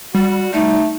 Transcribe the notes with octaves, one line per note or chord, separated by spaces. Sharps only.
G3 F#4
A3 D#4